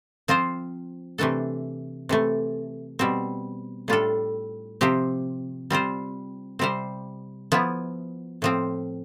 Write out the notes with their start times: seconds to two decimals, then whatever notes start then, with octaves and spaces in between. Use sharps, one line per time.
0.28 F3 C4 F4 C5
1.18 C3 E3 A3 D4 A4
2.09 C3 E3 A3
2.99 B2 G3 C4
3.88 A2 G3 D4 F4 A4
4.81 C3 F3 C4 G4
5.70 G3 C4 F4 C5
6.59 C3 G3 C4 G4 C5
7.52 F3 B3 E4
8.42 A2 F3 C4